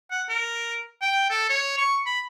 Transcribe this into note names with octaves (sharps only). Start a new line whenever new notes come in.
F#5
A#4
G5
A4
C#5
C#6
B5